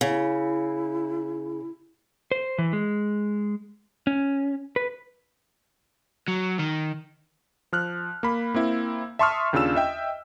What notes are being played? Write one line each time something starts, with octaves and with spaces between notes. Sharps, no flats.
C#3 E4
C5
E3
G#3
C#4
B4
F#3
D#3
F3 F6 F#6
A#3 B5
A#3 C4 E4
E5 A5 C6 C#6 D#6 F6
D#2 C#3 D4 F4 E6 E7
D#5 E5 G5